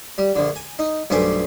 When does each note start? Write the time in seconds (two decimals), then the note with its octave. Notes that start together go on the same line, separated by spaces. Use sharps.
0.18 G3
0.35 A#1 D3
0.56 G#5
0.79 D#4
1.10 B1 G2 A3 C5 G#5 D6